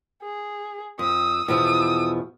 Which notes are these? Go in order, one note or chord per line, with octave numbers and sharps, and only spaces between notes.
G#4
F2 D#6 E6
E2 B2 F3 D#6 E6